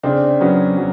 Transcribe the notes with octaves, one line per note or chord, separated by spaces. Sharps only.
C#3 C4 D4
F#3 B3 C#4
F#3